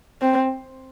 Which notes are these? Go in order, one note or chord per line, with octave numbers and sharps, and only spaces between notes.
C4